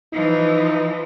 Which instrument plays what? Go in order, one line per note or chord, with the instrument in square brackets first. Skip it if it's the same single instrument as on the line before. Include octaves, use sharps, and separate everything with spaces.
[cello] E3 F3 [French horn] D#4